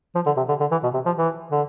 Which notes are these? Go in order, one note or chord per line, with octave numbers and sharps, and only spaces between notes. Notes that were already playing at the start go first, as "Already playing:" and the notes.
F3
D3
C3
D3
D3
E3
B2
C3
F3
E3
D3